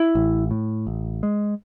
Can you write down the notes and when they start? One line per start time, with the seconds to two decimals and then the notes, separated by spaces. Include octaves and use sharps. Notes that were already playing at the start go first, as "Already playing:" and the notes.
Already playing: E4
0.15 A1
0.51 A2
0.87 A1
1.23 G#3